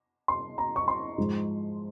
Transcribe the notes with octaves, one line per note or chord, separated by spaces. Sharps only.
C6
A#5
C#6
C6
G#2 F3 G#3